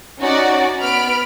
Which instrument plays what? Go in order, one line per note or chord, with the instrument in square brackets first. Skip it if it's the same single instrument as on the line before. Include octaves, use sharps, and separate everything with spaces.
[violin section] C#4 D#4 F#4 D5
B3 B5 F6 D7